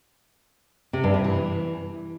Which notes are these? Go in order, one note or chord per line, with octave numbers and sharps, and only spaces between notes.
C3
G2
C3
E3